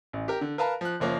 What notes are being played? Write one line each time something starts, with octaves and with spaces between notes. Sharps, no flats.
A1
G4 A#4
D3
A#4 B4 F5 A5 A#5
F3 F#6
F#1 F3 A#3 C#5